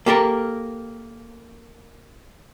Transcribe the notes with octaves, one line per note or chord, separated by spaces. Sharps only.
A#3 G4 A4 A#4